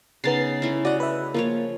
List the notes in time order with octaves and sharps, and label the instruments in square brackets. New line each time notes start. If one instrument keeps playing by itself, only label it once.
[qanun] C#3 D#4 [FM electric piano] B3 A6 C7
[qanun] A3 C#4 E4
[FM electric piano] F#4 D5 [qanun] D#5 F#5
[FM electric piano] B4 E5
[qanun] F3 F4 C#5 [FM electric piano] A#3